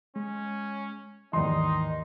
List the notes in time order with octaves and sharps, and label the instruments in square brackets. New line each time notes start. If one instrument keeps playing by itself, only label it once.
[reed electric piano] G#3 [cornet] C#4
[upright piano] D#2 D5 C6 [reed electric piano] G#2 E3 [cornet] D#4 [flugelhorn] D#5